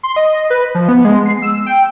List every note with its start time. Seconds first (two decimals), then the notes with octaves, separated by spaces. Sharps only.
0.03 C6
0.16 D#5
0.50 B4
0.75 F3
0.89 B3
1.05 G#3
1.26 C7
1.42 E6
1.66 G5